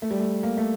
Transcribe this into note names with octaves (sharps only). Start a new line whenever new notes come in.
A3
G3
A3
A#3
A3